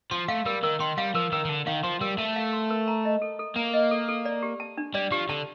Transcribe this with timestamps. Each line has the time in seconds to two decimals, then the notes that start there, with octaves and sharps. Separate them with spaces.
0.11 F3 C6
0.28 A3 F5
0.46 G3 A#4
0.63 D#3 A#4
0.80 D#3 C6
0.98 G3 F5
1.15 F3 A#4
1.32 D#3 A#4
1.45 D#3
1.49 D3 A5
1.67 D#3 F5
1.83 F3 C6
2.01 G3 A#4
2.18 A3 A5
2.36 F5
2.53 C6
2.70 A#4
2.88 A#5
3.05 D#5
3.22 A4
3.39 A4
3.56 A#3 A#5
3.74 D#5
3.91 A4
4.08 A4
4.25 D5
4.43 G4
4.60 A5
4.77 D4
4.94 G3 D5
5.11 F3 G4
5.29 D3 A5